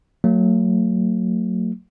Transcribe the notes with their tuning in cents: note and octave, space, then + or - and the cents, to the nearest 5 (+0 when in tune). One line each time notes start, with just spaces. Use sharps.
F#3 +0 A3 +45